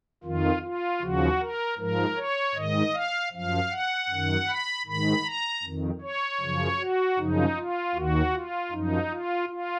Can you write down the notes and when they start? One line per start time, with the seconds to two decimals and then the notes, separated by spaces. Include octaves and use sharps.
0.24 F2 D#3 F4
0.62 F4
1.01 D#2 C#3 F3 F#4
1.40 A#4
1.78 G#2 F3 A#4
2.17 C#5
2.55 G#2 D#3 D#5
2.93 F5
3.32 F#2 F3 F5
3.70 F#5
4.09 F#2 D#3
4.47 B5
4.87 G#2 D#3 B5
5.25 A#5
5.63 F2 D#3
6.02 C#5
6.40 F#2 C#3 F3
6.79 F#4
7.18 F#2 C#3 F3 D#4
7.57 F4
7.95 D#2 D#3 F#4
8.33 F4
8.72 F#2 F3 D#4
9.10 F4
9.49 F4